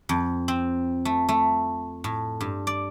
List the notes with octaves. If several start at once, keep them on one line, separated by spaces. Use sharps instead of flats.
F2
C4
A3
A3
A2
G2
D5